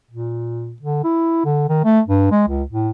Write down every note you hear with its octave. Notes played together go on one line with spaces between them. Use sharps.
A#2
D3
E4
D3
D#3
A3
G2
G#3
C#2
A2